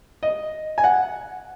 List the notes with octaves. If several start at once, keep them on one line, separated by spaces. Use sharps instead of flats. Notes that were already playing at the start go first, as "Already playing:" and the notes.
D#5
G#5
F#5